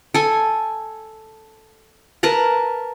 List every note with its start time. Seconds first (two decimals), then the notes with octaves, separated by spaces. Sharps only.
0.14 A4 G#5
2.23 A#4 B4 A5 A#5